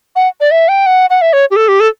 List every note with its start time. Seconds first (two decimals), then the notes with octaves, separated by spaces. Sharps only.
0.16 F#5
0.40 D5
0.51 E5
0.68 G5
0.86 F#5
1.10 F#5
1.21 E5
1.33 C#5
1.51 G4
1.56 A4
1.68 G4
1.80 A4